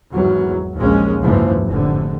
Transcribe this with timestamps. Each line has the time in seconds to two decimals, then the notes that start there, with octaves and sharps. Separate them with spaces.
0.12 G#1 E2 F#3
0.76 A#1 D#2 G#3 A#3 C#4
1.21 F#1 D2 G#2 E3 F3
1.65 F1 A2 D3